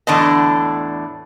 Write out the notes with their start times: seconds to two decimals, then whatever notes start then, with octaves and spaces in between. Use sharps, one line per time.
0.07 E2 A2 D3 B3 D4 D#5